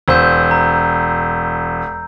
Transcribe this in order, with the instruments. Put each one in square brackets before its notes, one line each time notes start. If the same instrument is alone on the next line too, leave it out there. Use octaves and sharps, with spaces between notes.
[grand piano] E1 C5 [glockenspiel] E6 G6
[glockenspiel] A#5